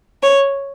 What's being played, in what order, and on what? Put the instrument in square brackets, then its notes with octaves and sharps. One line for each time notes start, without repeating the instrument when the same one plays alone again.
[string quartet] C#5